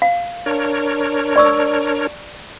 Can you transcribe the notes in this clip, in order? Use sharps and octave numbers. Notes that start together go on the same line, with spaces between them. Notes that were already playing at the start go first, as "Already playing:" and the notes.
F5
D4 A#4 C#5
D5 C#6 E6